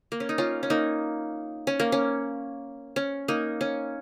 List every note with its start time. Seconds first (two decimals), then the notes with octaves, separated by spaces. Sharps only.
0.12 A#3
0.20 C#4
0.29 D#4
0.38 C#4 F4
0.63 C#4
0.70 A#3 D#4
1.67 C#4
1.80 A#3
1.92 C#4
2.96 C#4
3.28 A#3 D#4
3.61 C#4